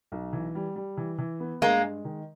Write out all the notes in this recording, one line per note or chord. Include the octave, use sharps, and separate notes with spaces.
B1
E3
G3
G3
E3
E3
B3
G2 G#3 A#3
G#3
D#3